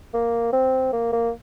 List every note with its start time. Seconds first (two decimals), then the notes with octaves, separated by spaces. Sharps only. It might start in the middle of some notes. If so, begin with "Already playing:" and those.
0.14 A#3
0.53 C4
0.93 A#3
1.12 A#3